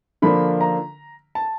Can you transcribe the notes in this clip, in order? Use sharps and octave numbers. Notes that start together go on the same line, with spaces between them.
D3 F3 A#3 D4 B5
A#5
A5